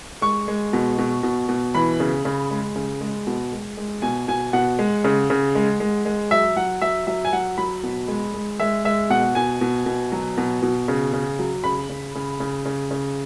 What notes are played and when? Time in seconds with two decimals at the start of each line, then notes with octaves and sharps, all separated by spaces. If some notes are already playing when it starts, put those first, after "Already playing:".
0.22 G#3 C#6
0.48 G#3
0.73 B2
0.98 B2
1.23 B2
1.49 B2
1.75 E3 B5
2.00 C#3
2.25 C#3
2.50 G#3
2.76 C#3
3.01 G#3
3.27 B2
3.52 G#3
3.77 G#3
4.02 B2 G#5
4.28 B2 G#5
4.53 B2 F#5
4.79 G#3
5.04 C#3
5.30 C#3
5.55 G#3
5.80 G#3
6.05 G#3
6.31 F#3 E5
6.56 F#3 F#5
6.81 F#3 E5
7.07 F#3 E5
7.25 G#5
7.33 F#3 F#5
7.58 F#3 B5
7.83 B2
8.08 G#3
8.34 G#3
8.60 G#3 E5
8.85 G#3 E5
9.10 B2 F#5
9.35 B2 G#5
9.61 B2
9.86 B2
10.12 F#3
10.37 B2
10.63 B2
10.88 C#3
11.13 C#3
11.39 F#3
11.64 C#3 B5
11.89 C#3
12.15 C#3
12.40 C#3
12.65 C#3
12.91 C#3